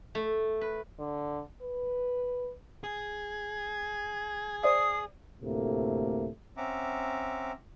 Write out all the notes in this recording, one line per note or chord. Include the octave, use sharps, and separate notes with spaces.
A3
B4
D3
B4
G#4 G#6
C5 D5 E5 D#6 C7
D2 A2 C3 A3 A#3
C4 C#4 E5 F#5 A#5 D6